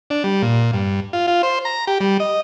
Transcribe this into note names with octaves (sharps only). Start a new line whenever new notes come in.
D4
G3
A#2
G2
F4
F4
C5
A#5
G4
G3
D#5